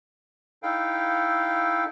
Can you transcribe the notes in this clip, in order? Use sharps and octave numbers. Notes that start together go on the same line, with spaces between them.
D#4 E4 A4 F5 G5